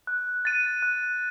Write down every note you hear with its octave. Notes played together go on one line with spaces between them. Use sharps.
F#6
A6 D#7
F#6